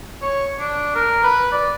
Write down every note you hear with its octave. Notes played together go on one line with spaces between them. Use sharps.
C#5
D4
A#4
B4
D5